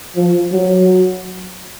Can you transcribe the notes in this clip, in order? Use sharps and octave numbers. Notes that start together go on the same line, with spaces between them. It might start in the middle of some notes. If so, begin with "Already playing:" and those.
F3
F#3